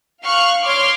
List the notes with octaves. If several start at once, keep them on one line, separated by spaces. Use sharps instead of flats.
F5 C#6 F6 F#6
C#5 C6 D6 F6